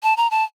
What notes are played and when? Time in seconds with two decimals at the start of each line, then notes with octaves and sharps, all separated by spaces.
0.03 A5
0.17 A#5
0.31 A5